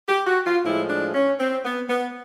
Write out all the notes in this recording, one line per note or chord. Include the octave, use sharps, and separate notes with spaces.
G4
F#4
F4
A2 F3 G#3 E4
D4
C#4
C4
B3
B3